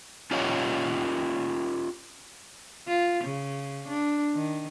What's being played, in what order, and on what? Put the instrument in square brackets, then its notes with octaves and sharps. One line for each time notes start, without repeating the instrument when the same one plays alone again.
[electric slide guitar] C#4 F4 G4 A#4 C#5 D#5
[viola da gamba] F4
C#3
D4
D#3